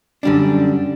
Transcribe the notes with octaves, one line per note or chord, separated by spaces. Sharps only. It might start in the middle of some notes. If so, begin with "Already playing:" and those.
F#2 D3 G3 D4